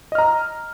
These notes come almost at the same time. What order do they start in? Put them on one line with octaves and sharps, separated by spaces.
D#5 F6 A#5